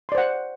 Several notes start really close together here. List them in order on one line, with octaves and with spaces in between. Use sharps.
C6 D5 C5 F#5